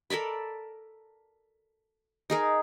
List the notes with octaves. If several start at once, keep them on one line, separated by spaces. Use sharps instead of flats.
A4 A#4 D5 B5
D#4 G#4 A#4